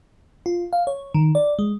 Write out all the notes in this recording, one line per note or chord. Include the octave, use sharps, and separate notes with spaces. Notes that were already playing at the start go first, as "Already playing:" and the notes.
F4
F5
C#5
D#3
D5
G#3